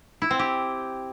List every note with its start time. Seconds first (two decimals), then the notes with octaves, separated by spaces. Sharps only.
0.22 E4
0.31 C4
0.39 G4